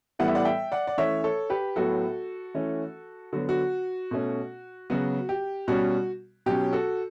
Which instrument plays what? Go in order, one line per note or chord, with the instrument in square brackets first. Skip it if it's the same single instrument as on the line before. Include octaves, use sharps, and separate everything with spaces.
[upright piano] A2 E3 G3 B3 F#5
E5
D5 F#5
E5 G5
D5 F#5
D5
E3 A3 C#4 C#5 E5
A4 C#5
G4 B4
A2 F#3 B3 F#4 A4
E3 A3 C#4
D3 F#3 B3 F#4
F#4
B2 A3 C#4
C#3 F#3 B3 F#4
G4
B2 G3 C#4 F#4
B2 F#3 C#4 G4
F#4 A4